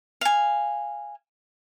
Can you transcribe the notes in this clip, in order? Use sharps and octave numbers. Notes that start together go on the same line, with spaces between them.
F5 G#5